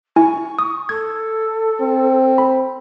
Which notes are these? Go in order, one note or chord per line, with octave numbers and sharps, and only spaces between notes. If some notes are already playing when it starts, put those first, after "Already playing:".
E4 G#5 C#6
D#6
A4 G#6
C4
B5